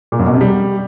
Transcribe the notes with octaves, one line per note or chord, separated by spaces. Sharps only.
A#2
F#2
B2
C3
G3